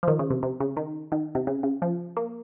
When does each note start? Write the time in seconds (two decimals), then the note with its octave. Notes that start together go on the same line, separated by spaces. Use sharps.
0.03 F3
0.08 D#3
0.19 C#3
0.30 C3
0.43 C3
0.60 C#3
0.77 D#3
1.12 D#3
1.35 C3
1.47 C#3
1.63 C#3
1.82 F3
2.17 A#3